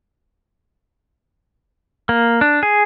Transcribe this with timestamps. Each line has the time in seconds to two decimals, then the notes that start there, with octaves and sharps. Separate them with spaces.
2.09 A#3
2.41 D4
2.63 G#4